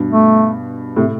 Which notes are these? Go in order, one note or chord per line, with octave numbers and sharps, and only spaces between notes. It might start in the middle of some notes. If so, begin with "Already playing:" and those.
Already playing: G2 B2
A3
A2 C3